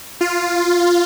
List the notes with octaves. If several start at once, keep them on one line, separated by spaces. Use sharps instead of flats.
F4